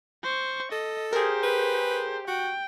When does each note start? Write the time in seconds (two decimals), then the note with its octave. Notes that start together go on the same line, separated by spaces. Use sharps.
0.23 C5 C#6
0.72 A4 D#5
1.13 G4 G#4 A#4 C5
1.43 B4
2.28 F#4 G5